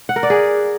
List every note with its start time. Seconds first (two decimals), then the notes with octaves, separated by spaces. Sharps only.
0.09 F#5
0.16 A#4
0.23 D5
0.30 G#4